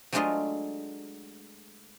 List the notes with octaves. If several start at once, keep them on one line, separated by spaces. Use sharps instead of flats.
F#3 G#3 A3 D4 F4 D#5